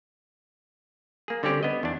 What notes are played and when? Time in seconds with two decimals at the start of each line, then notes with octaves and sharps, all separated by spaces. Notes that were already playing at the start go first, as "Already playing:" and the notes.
1.28 A#3 G#4
1.43 D3 G3 C4 C#4 G4
1.63 B3 D#5
1.83 E2 D4